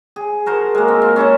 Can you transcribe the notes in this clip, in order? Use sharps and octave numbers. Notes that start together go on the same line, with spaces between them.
G#4
F#4 A#4 C5 A5
G#3 A#3
C4
F4
C#4 E4 A4 C5